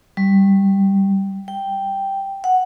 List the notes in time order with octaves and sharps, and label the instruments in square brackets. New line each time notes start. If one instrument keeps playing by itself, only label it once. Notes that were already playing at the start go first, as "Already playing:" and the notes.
[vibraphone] G3
G5
F#5